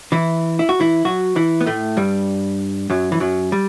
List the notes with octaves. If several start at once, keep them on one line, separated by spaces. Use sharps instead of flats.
E3 E4
E4
F#4
E3 E4
F#3 F#4
E3 E4
B3
A2 A3
G2 G3
F#2 F#3
E3
F#2 F#3
G3